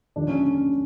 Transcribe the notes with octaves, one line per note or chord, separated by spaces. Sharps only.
D#2 D3 F3 D4
C#4
C#4